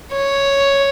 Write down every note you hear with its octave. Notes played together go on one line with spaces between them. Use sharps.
C#5